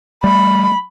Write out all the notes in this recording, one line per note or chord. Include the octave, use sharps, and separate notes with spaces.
G3 A3 B5